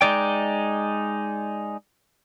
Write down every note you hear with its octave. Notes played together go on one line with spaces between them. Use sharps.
G#3 D#4 D5 G5